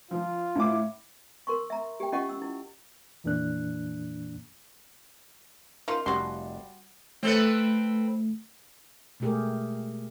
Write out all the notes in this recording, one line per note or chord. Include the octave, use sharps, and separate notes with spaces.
F3 F4
A2 D6
A#4 C6 C#6
E5 A#5
G4 G5
C#4 F4 G4 D#5 F#5 C#6
E6
E4
F2 A#2 E3 A#3 D4 F#6
D#4 F4 A#4
F1 G3 F#4 C6
A3 C4 A4 B4
B2 G#3 A3 G4 G#4 A#4